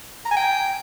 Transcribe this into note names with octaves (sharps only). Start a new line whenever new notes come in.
A#5
G#5
G5